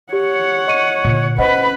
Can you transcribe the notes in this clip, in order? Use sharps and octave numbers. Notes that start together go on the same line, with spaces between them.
G4 C#5 F#5
D#5 C#6 D#7
A#2 D3
C#4 B4 C5 D#5 F#5 B5